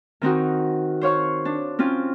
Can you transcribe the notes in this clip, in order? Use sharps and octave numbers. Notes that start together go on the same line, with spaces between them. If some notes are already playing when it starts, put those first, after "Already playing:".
D#3 C4 D#4 F#4
C5 C#5 F5 C#6
D4
C4 C#4 F4